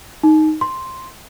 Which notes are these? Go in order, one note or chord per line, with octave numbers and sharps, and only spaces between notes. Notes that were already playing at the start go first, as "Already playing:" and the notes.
D#4
C6